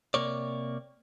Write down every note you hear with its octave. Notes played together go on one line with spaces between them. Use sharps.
C3 A#3 C#5 D5